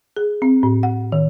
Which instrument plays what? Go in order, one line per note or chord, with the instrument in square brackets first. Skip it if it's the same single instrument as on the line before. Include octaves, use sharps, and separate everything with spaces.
[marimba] G#4
C4
A2
F#5
D#3